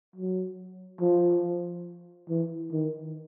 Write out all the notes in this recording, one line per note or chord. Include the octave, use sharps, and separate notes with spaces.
F#3
F3
E3
D#3